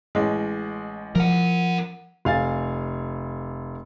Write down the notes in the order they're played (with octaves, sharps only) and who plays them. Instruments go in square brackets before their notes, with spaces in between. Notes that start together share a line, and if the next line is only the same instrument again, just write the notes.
[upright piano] A1 G#3
[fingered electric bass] F3 [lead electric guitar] A#4 F#5
[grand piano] F1 F5 G#5 A6